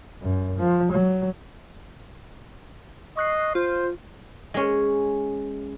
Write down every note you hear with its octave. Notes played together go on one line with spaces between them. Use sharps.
F#2
F3
F#3
D#5 C#6 F#6 C7
F4 C5
G#3 C#4